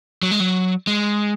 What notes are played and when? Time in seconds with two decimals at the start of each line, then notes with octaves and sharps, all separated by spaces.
0.23 F#3
0.31 G#3
0.40 F#3
0.87 G#3